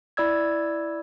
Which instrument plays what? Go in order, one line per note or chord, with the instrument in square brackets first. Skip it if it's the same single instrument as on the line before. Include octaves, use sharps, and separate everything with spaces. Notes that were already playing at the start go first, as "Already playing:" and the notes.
[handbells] E4 D5 E6 G#6